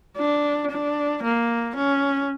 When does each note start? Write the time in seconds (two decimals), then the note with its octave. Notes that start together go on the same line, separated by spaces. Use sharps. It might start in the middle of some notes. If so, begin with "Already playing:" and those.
0.17 D4
0.71 D4
1.23 A#3
1.76 C#4